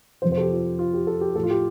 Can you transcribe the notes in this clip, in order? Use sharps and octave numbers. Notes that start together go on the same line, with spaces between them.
F2 C3 F3 C5
C5
A4
G4
F4
F4
G4
A4
G4
A2 F3 A4
F4
G4